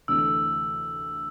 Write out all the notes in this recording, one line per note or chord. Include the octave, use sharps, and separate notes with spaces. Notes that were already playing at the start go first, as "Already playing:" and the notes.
D2 C3 E3 A3 D4 E6